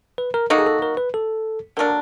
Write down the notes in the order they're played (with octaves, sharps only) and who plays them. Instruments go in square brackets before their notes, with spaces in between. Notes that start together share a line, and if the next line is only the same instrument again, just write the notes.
[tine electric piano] B4
A#4
[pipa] F#3 A#3 D#4 F#4 [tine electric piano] A4
[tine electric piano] G#4
A4
A#4
B4
A4
[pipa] D3 F#3 A#3 D4 [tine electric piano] A#4